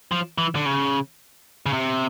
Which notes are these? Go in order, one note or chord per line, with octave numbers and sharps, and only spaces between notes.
F3
E3
D3
C#3
C#3
C3